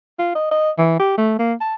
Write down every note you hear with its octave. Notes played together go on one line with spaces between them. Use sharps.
F4
D#5
D#5
E3
G4
A3
A#3
A5